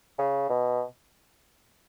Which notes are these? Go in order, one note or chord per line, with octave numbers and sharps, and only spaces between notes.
C#3
B2